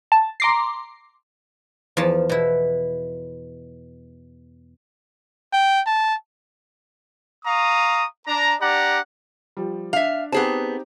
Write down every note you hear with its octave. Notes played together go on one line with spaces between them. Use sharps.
A5
A#5 C6 D6 A#6 C7
E2 F3 A5
B2 E4
G5
A5
F5 A#5 C#6 D#6
D4 A#5
D4 G4 D5 F#5 A#5
F3 G3
D4 E5 F5
B3 C4 D#4 G4 G#4 A5